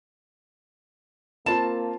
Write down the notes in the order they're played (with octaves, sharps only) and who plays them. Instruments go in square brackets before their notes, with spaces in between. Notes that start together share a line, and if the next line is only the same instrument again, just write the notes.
[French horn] A#3 [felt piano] C4 F4 [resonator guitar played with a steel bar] A5